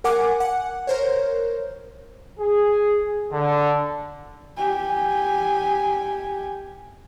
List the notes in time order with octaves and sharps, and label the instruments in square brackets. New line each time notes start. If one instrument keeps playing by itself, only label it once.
[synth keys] A#4 F#5 G#5 D6
F#5
A#4 C5 C#5
[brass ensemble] G#4
D3
[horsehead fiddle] G4 G#5